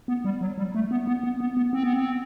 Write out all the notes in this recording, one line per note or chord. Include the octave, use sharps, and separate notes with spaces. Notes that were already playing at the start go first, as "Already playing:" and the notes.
B3
G3
F#3
G3
A3
B3
B3
B3
B3
B3
C4
B3
C4